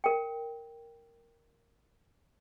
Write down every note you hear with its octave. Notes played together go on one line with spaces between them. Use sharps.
A#4 G5